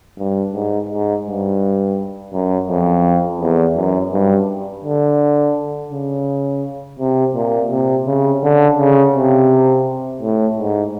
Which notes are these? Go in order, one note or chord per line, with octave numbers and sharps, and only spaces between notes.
G2
G#2
G#2
G2
F#2
F2
E2
F#2
G2
D3
C#3
C3
A#2
C3
C#3
D3
C#3
C3
A2
G#2